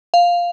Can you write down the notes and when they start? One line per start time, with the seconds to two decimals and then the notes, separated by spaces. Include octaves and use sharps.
0.14 F5